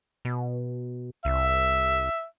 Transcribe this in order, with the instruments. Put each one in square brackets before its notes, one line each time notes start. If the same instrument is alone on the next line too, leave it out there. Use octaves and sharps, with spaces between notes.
[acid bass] B2
[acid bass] C2 [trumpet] E5